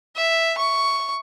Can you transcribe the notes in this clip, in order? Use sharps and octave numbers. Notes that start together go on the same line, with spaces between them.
E5
C#6